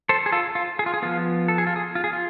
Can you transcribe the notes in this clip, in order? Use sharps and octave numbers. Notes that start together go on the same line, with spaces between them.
A4 C5
G#4
F4 A4
F4
G#4
F4
G#4
F3 B3 F4
A4
G#4
F4
G#4
F4
G#4
F4